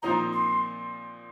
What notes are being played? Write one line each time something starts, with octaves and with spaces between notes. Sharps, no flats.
A#2 F3 C4 D#4 A#5
C6